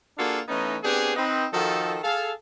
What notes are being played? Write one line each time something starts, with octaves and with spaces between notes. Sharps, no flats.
A#3 D4 F4 F#4 G#4 A4
E3 A3 B3 C#4 D#4
B3 C4 D4 G4 G#4
C4 D#4 B4
D#3 F3 D#4 F#4 A4
G#4 A4 F5